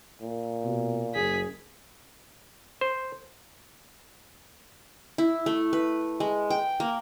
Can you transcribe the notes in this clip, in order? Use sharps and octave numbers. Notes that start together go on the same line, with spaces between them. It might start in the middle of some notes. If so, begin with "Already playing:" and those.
A#2
B2
F#1 G#4 B6
C5
E4
A3
B4
G#3
G5
A#3